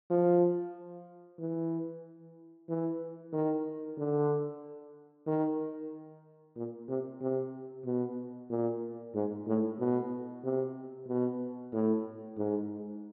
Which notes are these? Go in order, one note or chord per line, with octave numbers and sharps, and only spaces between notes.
F3
E3
E3
D#3
D3
D#3
A#2
C3
C3
B2
A#2
G#2
A2
B2
C3
B2
A2
G#2